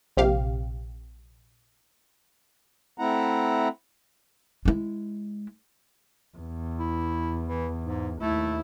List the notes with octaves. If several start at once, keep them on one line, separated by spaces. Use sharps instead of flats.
A#1 C3 G4 F5
A3 C4 E4 F#5 A#5
G#3 E4
E2
E4
E3
G#2
D#2 A3 E4